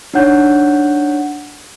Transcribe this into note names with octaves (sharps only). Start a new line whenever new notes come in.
D4 D#4 C#5 F#5 G6